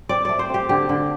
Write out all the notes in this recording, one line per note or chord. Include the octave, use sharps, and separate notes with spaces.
C4 D5
A3 D5
C5
C4 G4
D3 G4
D3